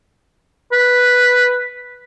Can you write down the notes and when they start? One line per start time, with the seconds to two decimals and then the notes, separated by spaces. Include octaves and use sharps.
0.72 B4